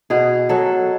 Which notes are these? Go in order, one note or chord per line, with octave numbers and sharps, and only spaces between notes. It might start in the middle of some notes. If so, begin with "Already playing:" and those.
B2 G#4
F#3 A4